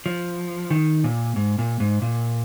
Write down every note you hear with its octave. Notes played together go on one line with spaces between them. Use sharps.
F3
D#3
A#2
G#2
A#2
G#2
A#2